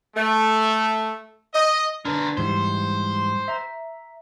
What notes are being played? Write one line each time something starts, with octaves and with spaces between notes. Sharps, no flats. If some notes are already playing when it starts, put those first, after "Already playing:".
A3
D#5
D3 D4 A#4 B4
G#2 E3 G3 C5
E5 A#5